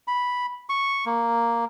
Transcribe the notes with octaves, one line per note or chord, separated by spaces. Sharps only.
B5
C#6
A#3